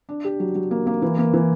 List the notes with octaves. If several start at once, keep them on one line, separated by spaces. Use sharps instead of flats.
D4
G4
F#3
F#3
A#3
A#3
E3
A#3
E3